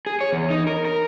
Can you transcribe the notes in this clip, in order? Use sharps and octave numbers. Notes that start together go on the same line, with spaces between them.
G#4
C#5
E2
D#4
A#4
A#4